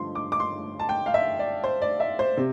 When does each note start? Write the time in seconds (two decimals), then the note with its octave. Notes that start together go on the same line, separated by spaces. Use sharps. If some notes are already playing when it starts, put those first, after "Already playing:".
Already playing: G2 D3 F3 A3 C6
0.15 D6
0.32 D6
0.40 C6
0.79 A5
0.89 G5
1.06 F5
1.14 E5
1.39 D5
1.64 C5
1.82 D5
2.00 E5
2.19 C5
2.37 C3